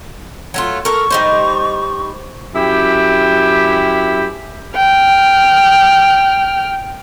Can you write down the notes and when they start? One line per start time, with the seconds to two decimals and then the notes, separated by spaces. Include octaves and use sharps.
0.54 F#3 A3 F4
0.85 A4 A#4 C#6
1.10 G3 D#4 C5
2.55 F#2 E4 G4
4.76 G5 F6